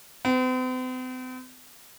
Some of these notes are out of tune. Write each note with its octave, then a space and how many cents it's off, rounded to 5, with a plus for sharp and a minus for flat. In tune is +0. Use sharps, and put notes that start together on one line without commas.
C4 -45